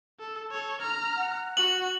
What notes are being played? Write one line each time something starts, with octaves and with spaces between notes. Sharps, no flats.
A4
A4 C#5
A#5 F6
F#5
F#4 F#7